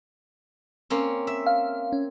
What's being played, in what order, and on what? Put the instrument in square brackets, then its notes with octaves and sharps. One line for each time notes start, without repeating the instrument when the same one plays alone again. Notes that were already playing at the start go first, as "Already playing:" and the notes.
[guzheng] A#3 C4 C#4
E5
[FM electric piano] F5
C#4